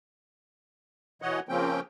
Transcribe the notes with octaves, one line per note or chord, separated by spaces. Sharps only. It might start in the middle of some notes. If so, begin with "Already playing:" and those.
B2 E3 C#5 D#5 F#5
C#3 F3 A#3 C4 C#4 G5